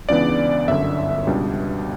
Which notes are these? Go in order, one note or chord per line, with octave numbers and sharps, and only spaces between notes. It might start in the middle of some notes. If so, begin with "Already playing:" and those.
C#2 C#3 E3 B3 D4 D5
G1 F#2 D3 E5
C#2 B2 G3 D4